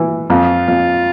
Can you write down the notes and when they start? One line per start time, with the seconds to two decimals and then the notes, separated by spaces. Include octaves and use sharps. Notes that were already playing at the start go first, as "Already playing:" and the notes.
Already playing: E3
0.30 F2 F4
0.68 F2